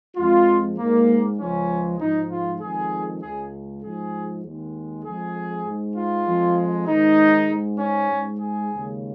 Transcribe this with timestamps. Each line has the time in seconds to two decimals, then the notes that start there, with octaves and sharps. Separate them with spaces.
0.17 F2 F3 G#3 F4
0.78 G#2 G#3 A#3
1.39 C#2 C#3 F3 G#3 C#4
2.00 G#2 F3 G#3 D#4
2.30 F4
2.61 F2 D#3 G#3 G#4
3.22 C#2 C#3 G#3 G#4
3.83 G#2 F3 G#3 G#4
4.43 D#2 D#3 G#3
5.05 F2 F3 G#3 G#4
5.65 G#2 G#3
5.96 F4
6.26 F2 F3 G#3
6.87 G#2 D#3 G#3 D#4
7.48 G#2 G#3
7.79 C#4
8.09 G#2 G#3
8.39 G#4
8.70 D#2 C#3 G#3